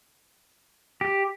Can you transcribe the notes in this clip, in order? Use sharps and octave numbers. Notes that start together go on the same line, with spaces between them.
G4